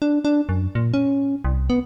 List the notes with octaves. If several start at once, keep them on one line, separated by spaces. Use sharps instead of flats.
D4
D4
F#2
A#2
C#4
C2
B3